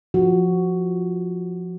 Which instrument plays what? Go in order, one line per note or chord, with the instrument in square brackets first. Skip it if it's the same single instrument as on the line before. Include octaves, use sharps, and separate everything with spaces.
[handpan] F3 F#4